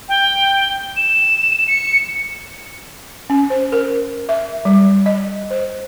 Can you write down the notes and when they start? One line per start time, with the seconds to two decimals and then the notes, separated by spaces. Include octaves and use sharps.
0.09 G5
0.97 E7
1.68 C#7
3.30 C#4
3.50 C5
3.72 A#4
4.29 E5
4.65 G3
5.06 D#5
5.50 C5